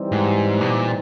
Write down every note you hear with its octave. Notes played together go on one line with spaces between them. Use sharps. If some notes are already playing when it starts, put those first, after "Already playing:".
Already playing: E3 G3 C4 D#4 G4
G#2
B2
A#2